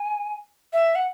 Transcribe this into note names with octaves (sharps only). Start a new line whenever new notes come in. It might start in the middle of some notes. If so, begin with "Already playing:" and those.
Already playing: G#5
E5
F#5